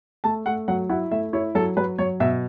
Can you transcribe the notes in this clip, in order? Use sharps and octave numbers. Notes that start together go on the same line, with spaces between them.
A3 A5
A3 F#5
F#3 F#5
E4 F#5
A3 E5
E4 C#5
F#3 A4
F#3 B4
F#3 C#5
B2 E5